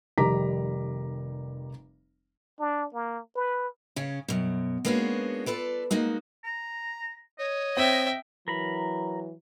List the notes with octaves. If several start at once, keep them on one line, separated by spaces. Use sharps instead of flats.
F1 D#3 G3 A#5 D6 B6
D4
A#3
B4
C#3 C#4
F#2 B2
G#3 A#3 B3 C#4 D4 F#4
F4 A4 B4 D5
G#3 A#3 D#4 F#4
A#5
C#5 D#5
C4 E5 G5
E3 F#3 A#4 A#5 B5